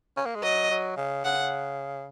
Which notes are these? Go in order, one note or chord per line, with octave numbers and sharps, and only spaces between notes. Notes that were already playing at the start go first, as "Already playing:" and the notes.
C#4
A#3
G#3
F#3 D#5
F#3
C#3
C#3 F#5